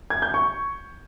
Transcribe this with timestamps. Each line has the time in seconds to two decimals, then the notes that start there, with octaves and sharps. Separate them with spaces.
0.10 G#6
0.22 G6
0.34 C#6